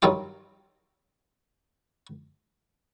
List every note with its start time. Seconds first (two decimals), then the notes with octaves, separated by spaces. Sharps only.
0.02 G2 D#3 F#3 G3 F4 D6